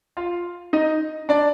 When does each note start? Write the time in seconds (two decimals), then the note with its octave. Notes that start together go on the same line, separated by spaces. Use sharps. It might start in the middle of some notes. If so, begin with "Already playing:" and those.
0.17 F4 F5
0.73 D#4 D#5
1.29 D4 D5